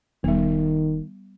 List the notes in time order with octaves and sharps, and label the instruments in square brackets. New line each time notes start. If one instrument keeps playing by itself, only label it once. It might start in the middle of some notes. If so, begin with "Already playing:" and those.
[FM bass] E1 [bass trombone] D#3 [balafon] G3 B3